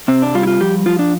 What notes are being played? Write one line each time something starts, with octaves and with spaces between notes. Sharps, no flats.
C3 C4
D4
G3 F4
E4
F4
F3 G4
F3 F4
D4